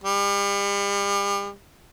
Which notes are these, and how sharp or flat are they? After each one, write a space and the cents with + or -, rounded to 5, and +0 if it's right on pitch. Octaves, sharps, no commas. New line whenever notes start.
G3 +40